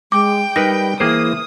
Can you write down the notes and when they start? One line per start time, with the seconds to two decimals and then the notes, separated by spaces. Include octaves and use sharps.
0.12 G#3 G5 D6
0.56 G3 D#4 A#4 B4 A#6
1.00 E3 A#3 G#4 C5 D#6